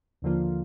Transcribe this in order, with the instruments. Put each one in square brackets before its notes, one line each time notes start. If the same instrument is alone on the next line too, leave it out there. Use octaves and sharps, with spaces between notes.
[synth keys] D#2 D3 F3 A#3 F4